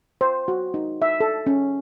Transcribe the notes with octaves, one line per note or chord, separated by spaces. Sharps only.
C5
F#4
D#4
E5
A4
C#4